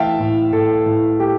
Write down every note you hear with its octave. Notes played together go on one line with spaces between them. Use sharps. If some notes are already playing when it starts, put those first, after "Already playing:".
Already playing: E3 A3 E5 F5 G5 A5
A2
A2 A4
A2
A3 G4